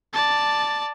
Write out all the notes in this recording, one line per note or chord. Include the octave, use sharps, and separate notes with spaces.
D5 A5